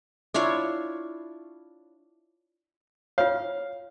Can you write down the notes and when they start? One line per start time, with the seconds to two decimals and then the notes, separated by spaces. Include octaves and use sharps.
0.34 D4 E4 F4 C#5
3.18 F4 C#5 F5